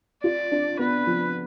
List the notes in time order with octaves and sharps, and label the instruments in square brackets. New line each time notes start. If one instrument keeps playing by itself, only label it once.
[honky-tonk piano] F4 [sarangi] D5
[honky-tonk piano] D4
[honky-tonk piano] B3 [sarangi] B4
[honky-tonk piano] F3